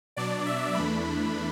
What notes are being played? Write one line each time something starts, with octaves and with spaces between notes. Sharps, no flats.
B2 F#3 D4 D5
E5
E2 E3 A3 D4 B5